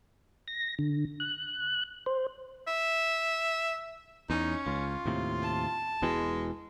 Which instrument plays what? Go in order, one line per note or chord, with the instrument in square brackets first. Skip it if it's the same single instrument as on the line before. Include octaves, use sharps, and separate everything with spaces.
[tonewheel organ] A#6
D3
F#6
C5
[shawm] E5
[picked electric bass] E2 [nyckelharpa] C#4 [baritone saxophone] D#4
[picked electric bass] C#2 [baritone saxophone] F4
[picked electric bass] D#2 A2 C3
[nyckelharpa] A5
[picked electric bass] E1 B2 E3 [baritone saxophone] G#3